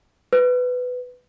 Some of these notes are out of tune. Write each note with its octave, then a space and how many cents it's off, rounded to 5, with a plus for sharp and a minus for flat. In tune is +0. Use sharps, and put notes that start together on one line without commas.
B4 +10